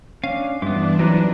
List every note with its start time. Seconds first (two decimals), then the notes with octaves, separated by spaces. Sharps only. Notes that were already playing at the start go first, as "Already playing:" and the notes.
0.24 C#4 D4 F5
0.62 G2 E3 B3 D4 E5 C6 D6
0.99 F#3 C4 D#4 E4 G4 B4 D#5